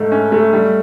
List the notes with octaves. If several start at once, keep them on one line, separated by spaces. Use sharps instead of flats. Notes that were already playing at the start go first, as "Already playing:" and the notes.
Already playing: G#2 A3
C#4
A3
G3